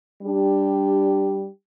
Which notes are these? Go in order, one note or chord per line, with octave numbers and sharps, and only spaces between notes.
G3 D4 G4